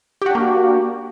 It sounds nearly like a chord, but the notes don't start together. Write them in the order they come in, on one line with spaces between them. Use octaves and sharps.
G4 F#4 D4 A#3